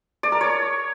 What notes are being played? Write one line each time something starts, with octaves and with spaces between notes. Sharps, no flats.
D5
A#4
C#5